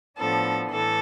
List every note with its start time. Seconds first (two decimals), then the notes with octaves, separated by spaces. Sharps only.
0.17 A2 F3 B3 D4 A4
0.70 A2 E3 A4